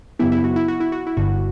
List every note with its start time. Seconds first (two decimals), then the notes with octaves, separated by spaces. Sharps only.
0.19 F#2 C#3 F#3 B3 E4 G4
0.32 E4
0.44 F#4
0.56 E4
0.68 F#4
0.80 E4
0.92 F#4
1.07 E4
1.17 G1 G2 D3 F#4